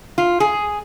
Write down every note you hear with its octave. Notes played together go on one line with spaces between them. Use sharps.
F4
G#4